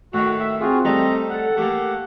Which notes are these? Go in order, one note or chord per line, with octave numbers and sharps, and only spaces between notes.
A2 D#3 F#4
E5
C4 F4 F#4 G#4
G3 A3 D#4 D#5 A#5
A4 F#5
A3 A#3 G4